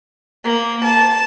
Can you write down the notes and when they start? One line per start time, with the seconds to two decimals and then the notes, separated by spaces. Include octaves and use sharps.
0.44 A#3
0.84 A5